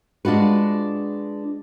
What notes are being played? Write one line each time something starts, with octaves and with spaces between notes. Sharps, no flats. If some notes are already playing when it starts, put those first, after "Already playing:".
G#3 D4 F4 F#4 B4